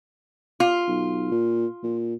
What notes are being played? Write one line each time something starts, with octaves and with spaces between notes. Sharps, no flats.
F4
B1
A#2
A#2